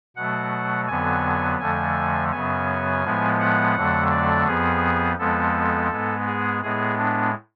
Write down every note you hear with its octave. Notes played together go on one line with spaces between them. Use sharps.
B2 F#3 A3 F#5
F2 D3 F#3 B3 G#5
F2 D3 F3 A3 G#5
F#2 C#3 F#3 B3 G#5
A2 F3 G#3 B3
F#5
F2 D3 F#3 A3
D5
F2 F3 B3 G#4
F2 F3 G#3 B3 A4
G#2 G#3 B3
G#4
A2 G#3 B3 G#4
D4